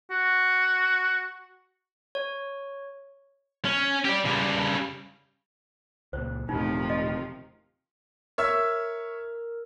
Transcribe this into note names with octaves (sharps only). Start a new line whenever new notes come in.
F#4
C#5
C#4
G4 D5
C#3 G3
C#2 A#2 C5
E1 A2 C3 D#3 F3 A3 D#4
D#5
A#4 C#5 E5 E6